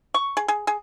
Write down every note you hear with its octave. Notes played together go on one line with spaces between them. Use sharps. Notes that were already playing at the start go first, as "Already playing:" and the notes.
C#6
G#4
G#4
G#4